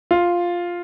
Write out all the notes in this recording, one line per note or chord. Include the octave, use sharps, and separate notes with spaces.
F4